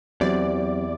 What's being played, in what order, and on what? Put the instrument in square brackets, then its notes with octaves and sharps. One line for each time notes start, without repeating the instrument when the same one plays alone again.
[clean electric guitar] E2 [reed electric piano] F#3 C4 G4 [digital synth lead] D5